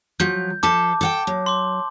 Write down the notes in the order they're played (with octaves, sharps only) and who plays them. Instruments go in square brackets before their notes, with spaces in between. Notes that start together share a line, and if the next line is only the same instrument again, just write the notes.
[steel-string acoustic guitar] F3 F#3 [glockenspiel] G6
[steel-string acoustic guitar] F3 A4 C5 [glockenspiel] A5 D6
[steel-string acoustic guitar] A4 F#5 G5
F#3
[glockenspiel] C6 D6